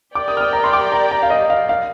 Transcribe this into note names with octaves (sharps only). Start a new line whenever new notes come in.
G4 A#4 D5 G5 D6
D#6
F6
D#6
A#5
C6
D6
A#5
A#5
F5
D#5
F5
F5